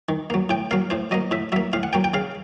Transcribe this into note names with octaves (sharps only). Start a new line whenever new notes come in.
D#3
F#3 A#3
A2 G5
F#3 A#3 F5
A2 C5
F#3 A#3 D#5
A2 E5
F#3 A#3 E5
A2 F5
F#5
F#3 A#3 G5
G5
C#3 F5